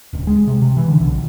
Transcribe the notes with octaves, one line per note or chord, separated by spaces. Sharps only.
D1
G#3
C3
C3
E3
D3
B1
A#1